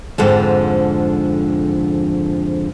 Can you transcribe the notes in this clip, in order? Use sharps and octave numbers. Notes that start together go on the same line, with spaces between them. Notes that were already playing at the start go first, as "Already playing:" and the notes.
F2 G#2 D3 F3